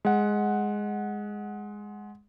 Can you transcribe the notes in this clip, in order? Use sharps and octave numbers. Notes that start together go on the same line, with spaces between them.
G#3 F#5